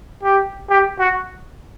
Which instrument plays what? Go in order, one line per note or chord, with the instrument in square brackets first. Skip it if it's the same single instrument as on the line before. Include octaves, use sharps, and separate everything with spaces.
[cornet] G4
G4
F#4